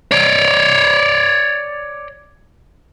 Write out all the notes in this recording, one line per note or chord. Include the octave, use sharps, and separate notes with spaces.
C#5 D5